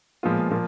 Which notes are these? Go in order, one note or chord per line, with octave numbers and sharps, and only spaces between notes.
A#2 F3 G#3 B3 F4
A#2 F3 A#3